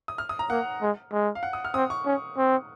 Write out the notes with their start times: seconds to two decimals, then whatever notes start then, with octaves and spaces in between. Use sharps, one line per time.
0.08 D#6
0.18 F6
0.29 D#6
0.39 A#5
0.50 A#3 F#5
0.81 G#3
1.12 G#3
1.35 F5
1.43 F#5
1.53 D#6
1.65 F6
1.74 C4 D#6
1.90 C#6
2.05 C#4
2.37 C4